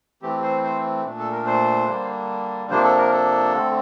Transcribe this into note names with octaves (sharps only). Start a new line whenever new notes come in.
E3 A3 C4 G4
C5
C5
A#2 A3 D4
A4
A#4
C5
D3 G3 A#3 D4
C3 F3 A#3 D4 C5
A4
A#4
A4
D3 A3 C4